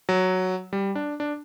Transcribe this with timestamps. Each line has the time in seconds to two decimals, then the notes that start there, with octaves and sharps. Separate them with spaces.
0.09 F#3
0.73 G3
0.95 D4
1.20 D4